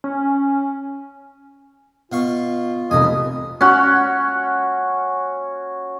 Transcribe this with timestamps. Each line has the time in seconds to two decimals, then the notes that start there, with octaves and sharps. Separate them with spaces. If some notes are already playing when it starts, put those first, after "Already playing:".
0.04 C#4
2.12 B2 F4 F5 C#6
2.91 F1 C2 F2 D#5 G#5
3.61 C#4 F#4